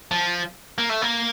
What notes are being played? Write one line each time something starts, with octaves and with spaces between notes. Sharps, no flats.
F3
A#3
A3
A#3